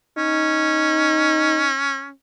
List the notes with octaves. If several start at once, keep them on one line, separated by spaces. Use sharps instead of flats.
C#4 D#4